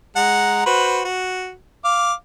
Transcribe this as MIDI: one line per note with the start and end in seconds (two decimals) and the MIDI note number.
0.16 0.64 56
0.16 0.64 78
0.16 0.64 82
0.66 1.02 66
0.66 1.02 71
0.66 1.02 72
1.04 1.53 66
1.84 2.13 77
1.84 2.13 86